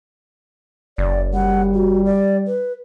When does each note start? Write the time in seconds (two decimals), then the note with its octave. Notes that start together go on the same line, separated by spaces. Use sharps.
0.98 F#1 D5
1.34 G3 F#5
1.74 F#4
2.06 D5
2.47 B4